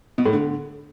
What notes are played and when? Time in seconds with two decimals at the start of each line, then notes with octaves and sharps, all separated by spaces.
0.18 B2
0.26 A2
0.33 D3